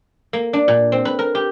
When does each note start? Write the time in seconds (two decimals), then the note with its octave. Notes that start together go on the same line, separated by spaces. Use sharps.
0.33 A#3
0.53 D4
0.68 A#2
0.92 C4
1.05 B4
1.19 A#4
1.35 G4